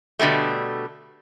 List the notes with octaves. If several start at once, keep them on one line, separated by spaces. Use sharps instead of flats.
B2 D3 G3 A3